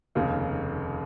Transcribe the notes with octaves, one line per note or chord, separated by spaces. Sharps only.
F1 D#2 C#3